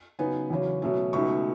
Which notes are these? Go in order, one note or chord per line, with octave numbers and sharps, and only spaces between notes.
C#3 F#3 B3 D#4 G#5
E2 C#3 F#3 C#4
B2 F#3 A3 C#4
C#2 B2 A3 D#4 C#6